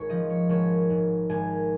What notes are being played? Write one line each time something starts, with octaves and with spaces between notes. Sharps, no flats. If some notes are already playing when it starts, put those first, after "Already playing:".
Already playing: G#1 C#5
F3 D#5
C#5
G#1 C#5
G#2
G#1 G#5